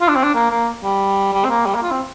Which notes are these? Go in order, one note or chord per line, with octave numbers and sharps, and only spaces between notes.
F4
D4
C4
D4
A#3
A#3
G3
G3
C4
A#3
G3
A#3
F4
C4